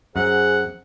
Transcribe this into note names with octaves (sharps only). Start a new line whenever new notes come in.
F#2 G#4 C5 F#5